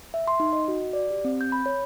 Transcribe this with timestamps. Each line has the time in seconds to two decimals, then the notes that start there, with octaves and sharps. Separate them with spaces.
0.14 E5
0.28 C6
0.40 D#4
0.53 D#5
0.68 F#4
0.93 D5
1.10 G4
1.25 C4
1.41 G6
1.52 B5
1.66 C#5